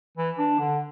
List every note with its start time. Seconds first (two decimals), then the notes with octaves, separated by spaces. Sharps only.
0.17 E3
0.39 D4
0.59 D3